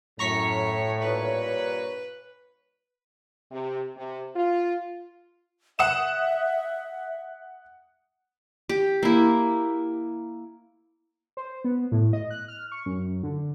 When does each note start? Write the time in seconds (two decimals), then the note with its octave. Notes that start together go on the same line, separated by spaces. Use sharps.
0.19 F#2 A2 C#5 A#5 C#6 B6
1.01 G2 A#2 B4 C#5
3.52 C3
3.97 C3
4.36 F4
5.79 E5 F#5 D#6 E7
8.69 G4
9.03 A#3 E4
11.37 C5
11.64 B3
11.92 A2
12.13 D#5
12.30 F#6
12.48 F6
12.72 C#6
12.86 F#2
13.23 D3